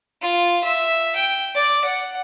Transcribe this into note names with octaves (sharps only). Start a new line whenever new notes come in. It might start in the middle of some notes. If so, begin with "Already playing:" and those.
F4
E5
G5
D5
F#5